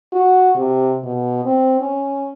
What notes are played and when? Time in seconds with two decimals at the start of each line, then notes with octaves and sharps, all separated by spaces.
0.12 F#4
0.57 C3
1.04 B2
1.45 C4
1.80 C#4